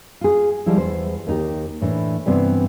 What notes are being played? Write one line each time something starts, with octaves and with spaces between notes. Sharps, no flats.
F4 G#4
D#3 F3 G3 G#3 E4
E2 C5
D#2 D#4 G4
A2 E3 D4
G2 C3 E3 B3 C4